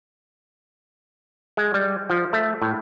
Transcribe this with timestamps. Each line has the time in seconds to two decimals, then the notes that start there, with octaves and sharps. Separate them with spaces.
1.57 G#3
1.74 G3
2.10 F3
2.33 A3
2.62 A2